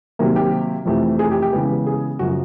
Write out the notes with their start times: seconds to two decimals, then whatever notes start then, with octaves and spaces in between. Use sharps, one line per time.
0.19 C3 D#3 F#3 A#3
0.36 G4
0.85 F2 C3 E3 A3
1.19 G#4
1.31 G4
1.42 G4
1.53 C#3 E3 G#3 B3
1.87 G#4
2.19 F#2 C#3 F3 F#4